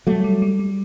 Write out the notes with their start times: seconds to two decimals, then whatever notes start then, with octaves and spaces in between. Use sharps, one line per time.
0.07 F#3 G3 A3
0.24 G3
0.42 G3
0.59 G3